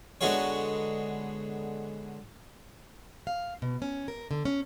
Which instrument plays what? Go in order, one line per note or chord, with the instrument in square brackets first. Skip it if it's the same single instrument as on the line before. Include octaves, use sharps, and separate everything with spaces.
[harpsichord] D3 G#3 B3 F#4 G#4 C#5
[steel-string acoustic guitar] F5
B2
C#4
A#4
D3
C#4